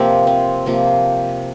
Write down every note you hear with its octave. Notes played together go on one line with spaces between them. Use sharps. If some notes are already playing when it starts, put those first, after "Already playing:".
Already playing: C3 F3 A#3 C4
C4
C3 F3 A#3